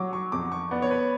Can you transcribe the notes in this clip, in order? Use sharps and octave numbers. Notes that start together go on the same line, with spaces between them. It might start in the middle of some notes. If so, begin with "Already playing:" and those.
Already playing: F#3 C#6 D6
C#6
F2 D6
C#6
B3 D5
C#5
B4